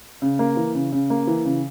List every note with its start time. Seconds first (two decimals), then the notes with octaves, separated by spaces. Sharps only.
0.22 C#3
0.39 A#3
0.56 E3
0.75 C#3
0.92 C#3
1.10 A#3
1.27 E3
1.45 C#3